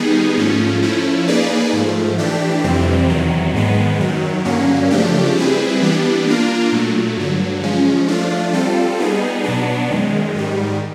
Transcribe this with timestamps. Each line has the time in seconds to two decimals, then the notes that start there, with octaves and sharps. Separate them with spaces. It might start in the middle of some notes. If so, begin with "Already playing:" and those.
Already playing: D#3 G3 B3 D#4 G#4
0.37 G#2 F3 A3 C#4
0.82 F3 A3 C#4 E4
1.28 A#3 D#4 G#4 B4 D5
1.73 G#2 F3 A3
2.18 E3 A3 D4 G4
2.64 F2 C3 E3 G3 C4
3.10 E2 C3 D#3 F#3
3.54 G#2 D#3 G#3 B3
4.00 F#2 D#3 F#3
4.45 G2 D3 F#3 A#3 C#4
4.91 C#3 F3 A3 D4 G4
5.36 G3 C4 E4 G#4 B4
5.81 E3 G3 B3 D4 G4
6.26 A#3 D4 F4 A#4
6.72 A#2 F#3 A3
7.17 G2 D3 F#3
7.63 F3 G#3 C#4
8.08 F3 A3 D4 F4
8.53 G3 C4 F4 A4
8.99 G3 B3 D#4 G#4
9.44 B2 F#3 B3 D4
9.89 F#2 D#3 G#3
10.34 G#2 D#3 G3